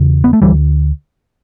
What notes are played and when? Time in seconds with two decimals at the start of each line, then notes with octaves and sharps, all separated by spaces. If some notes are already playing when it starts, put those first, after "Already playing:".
Already playing: E2 C#3
0.24 B3
0.33 A3
0.42 D2 D3 E3 G3